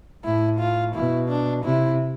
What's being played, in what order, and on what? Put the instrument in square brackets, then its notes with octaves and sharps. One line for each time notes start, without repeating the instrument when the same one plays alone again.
[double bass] A2 [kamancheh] E4
[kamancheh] F4
[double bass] B2 [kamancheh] E4
[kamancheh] D4
[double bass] C3 [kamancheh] E4